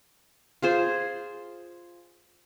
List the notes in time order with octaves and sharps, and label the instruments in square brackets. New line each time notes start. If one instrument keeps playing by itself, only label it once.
[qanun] F4 G#4 C5